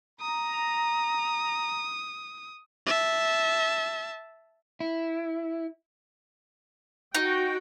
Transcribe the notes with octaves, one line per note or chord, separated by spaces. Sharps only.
A#5 D#6
E5 A5
E4
D#4 F#4 G5